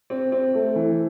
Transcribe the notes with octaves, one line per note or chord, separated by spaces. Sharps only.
C4
C4
A3
E3